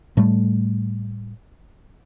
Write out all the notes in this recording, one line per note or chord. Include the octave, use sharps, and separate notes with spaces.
A2 G3 A3